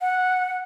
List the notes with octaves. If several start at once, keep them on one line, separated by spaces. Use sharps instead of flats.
F#5